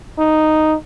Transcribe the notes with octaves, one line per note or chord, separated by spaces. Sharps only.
D#4